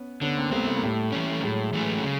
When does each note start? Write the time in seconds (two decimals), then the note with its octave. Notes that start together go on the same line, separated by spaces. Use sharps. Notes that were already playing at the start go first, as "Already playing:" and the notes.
Already playing: B3 C#4
0.22 D3 B3 C#4
0.37 A#3 C4
0.52 G3 A3 B3 C4
0.67 A3
0.76 A#3
0.83 A2 G3 A3
1.12 E3 A3 C#4
1.43 A2 F#3 G#3
1.73 E3 A3 C#4
2.04 C#3